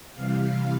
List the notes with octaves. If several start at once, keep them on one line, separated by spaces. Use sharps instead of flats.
C3 E3 G3 F5